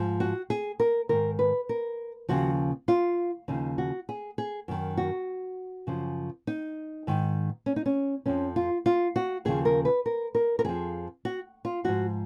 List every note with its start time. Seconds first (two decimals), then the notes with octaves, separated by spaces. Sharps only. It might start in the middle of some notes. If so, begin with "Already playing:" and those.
Already playing: G#2 F3
0.20 F#4
0.50 G#4
0.80 A#4
1.09 G#2 D#3 A#4
1.39 B4
1.69 A#4
2.29 D#2 C#3 F3 F#4
2.88 F4
3.48 D#2 C#3 F3 D#4
3.78 F#4
4.09 G#4
4.38 G#4
4.68 F#2 D#3
4.97 F#4
5.87 F#2 C#3 F3
6.47 D#4
7.07 G#2 D#3
7.66 C#4
7.76 D#4
7.86 C#4
8.26 F2 F3 C#4
8.56 F4
8.86 F4
9.16 F#4
9.45 D#2 C#3 F3 G#4
9.65 A#4
9.85 B4
10.06 A#4
10.35 A#4
10.59 A#4
10.65 F2 F3 G#4
11.25 F#4
11.65 F4
11.84 G#2 F3 F#4